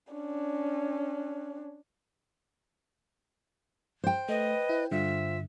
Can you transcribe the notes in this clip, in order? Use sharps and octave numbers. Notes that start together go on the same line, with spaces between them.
C#4 D4
C5 G5
A3 B4 D#5
E4
G2 D3 F4 E5